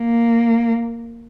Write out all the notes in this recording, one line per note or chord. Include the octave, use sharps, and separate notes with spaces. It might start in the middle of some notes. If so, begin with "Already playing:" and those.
Already playing: A#3